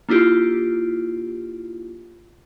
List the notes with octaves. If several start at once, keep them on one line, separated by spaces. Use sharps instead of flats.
A#3 D4 E4 F4 G4